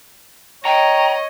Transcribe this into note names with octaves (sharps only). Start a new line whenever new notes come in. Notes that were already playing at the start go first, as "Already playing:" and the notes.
C#5 D#5 G5 A#5